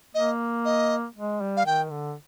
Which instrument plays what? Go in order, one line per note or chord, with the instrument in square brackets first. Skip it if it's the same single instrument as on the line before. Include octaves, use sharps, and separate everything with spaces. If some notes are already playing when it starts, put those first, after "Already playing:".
[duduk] A#3 [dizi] D#5
[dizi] D#5
[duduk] G#3
G3
[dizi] F5
[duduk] D#3 [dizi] G5
[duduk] D3